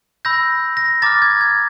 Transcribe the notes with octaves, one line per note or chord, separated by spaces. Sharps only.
B5 E6 G6 A#6
A#6
A#5 D6 F6 A6
G#6
G#6